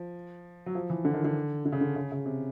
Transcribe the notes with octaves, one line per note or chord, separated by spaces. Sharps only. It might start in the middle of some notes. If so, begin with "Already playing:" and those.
Already playing: F3
F#3
F3
E3
D3
D#3
D3
D3
C#3
D3
C#3
C#3
C3